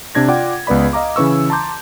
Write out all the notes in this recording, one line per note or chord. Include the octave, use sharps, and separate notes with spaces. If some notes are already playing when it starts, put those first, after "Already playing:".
C3 D4 G#6 A#6
F4 D5 F#5 G5 D6
C#2 B3 B4 D5 B5
D#5 F5 A#5 D6
C#3 E3 C#4 B4 C#6 E6
A5 A#5 C6 D6 G6